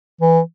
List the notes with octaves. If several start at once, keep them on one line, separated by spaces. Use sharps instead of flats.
E3